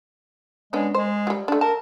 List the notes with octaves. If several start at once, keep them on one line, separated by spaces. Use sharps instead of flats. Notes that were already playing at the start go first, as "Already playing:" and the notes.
G#3 B3 C#4 D4
G#3 C5
F#3 G3
A3 D4
A#4 A5